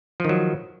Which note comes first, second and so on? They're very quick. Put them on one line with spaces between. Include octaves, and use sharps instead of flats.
F3 D#3 F#3